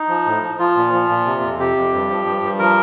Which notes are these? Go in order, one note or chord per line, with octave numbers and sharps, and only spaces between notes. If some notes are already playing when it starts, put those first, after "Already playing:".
Already playing: D#4
F3
A2
F3
F3 F4
A#2
F3
A#2
C3
F2
C3 G4
F2
G2
F3
G2
G2
F3 A#4